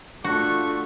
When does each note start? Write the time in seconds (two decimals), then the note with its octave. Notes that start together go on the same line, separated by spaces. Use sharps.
0.24 A3 D4 F4 F#4 C#6